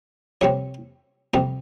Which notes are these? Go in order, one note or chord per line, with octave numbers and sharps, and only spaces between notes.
F2 C3 G3 C4 C#5
F2 C3 G3 C4